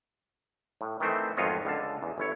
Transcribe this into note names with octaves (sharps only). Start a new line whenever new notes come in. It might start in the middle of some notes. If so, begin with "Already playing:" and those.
A2
D#3 E3 A3 C4 C5
G#1 F2 B3 F4 C#5 D#5
C#2 D3 F5 A5
E2
G1 E4 C#5